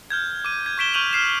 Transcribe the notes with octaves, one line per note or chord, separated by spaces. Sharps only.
F6 G6 G#6
D6 D#7
G#6
C#6 G#6 B6 D7 E7 G7
C#6 F6 G6 D#7 F7 F#7
F6 C7 E7